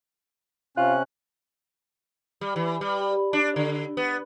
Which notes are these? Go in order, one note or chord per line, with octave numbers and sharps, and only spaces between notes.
C3 C#4 F4 F#6
G3
E3
G3
D4
D3
B3